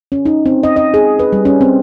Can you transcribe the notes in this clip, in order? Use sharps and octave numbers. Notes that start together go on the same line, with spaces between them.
C#4
D#4
C4
D#5
D#5
G#4
B4
G3
C#4
C4